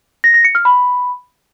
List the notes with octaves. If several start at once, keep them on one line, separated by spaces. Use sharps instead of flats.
A#6
A#6
C#7
F6
B5